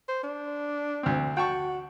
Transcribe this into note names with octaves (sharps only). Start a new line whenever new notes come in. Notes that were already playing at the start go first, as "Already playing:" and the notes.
C5
D4
D2 C4
F#4 G5 A5 C#6